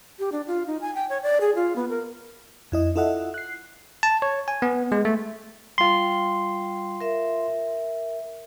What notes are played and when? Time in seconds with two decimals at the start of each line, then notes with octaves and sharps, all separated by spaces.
0.19 G4
0.32 D4
0.47 F4
0.67 D#4
0.81 G#5
0.95 G5
1.10 C#5
1.22 D5
1.41 G#4
1.55 F4
1.76 B3
1.90 A#4
2.72 F2 E4 D#5
2.96 E4 F4 A4 D#5 E5 F#5
3.34 F#6 C7
4.03 A5
4.22 C#5
4.48 G#5
4.62 B3
4.92 G#3
5.05 A3
5.78 G3 F4 G5 C6
7.01 A#4 E5